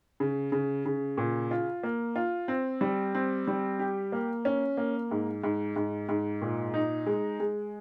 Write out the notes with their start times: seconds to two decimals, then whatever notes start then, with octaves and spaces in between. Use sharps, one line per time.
0.20 C#3
0.52 C#3
0.86 C#3
1.17 A#2
1.51 F4
1.83 A#3
2.16 F4
2.48 C4
2.81 G3
3.15 C4
3.48 G3
3.79 G4
4.12 A#3
4.45 C#4
4.77 A#3
5.11 G#2
5.44 G#2
5.76 G#2
6.09 G#2
6.42 A#2
6.74 D#4
7.06 G#3
7.40 G#3